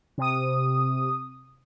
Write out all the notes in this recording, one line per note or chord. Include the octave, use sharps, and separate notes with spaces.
C3 D#6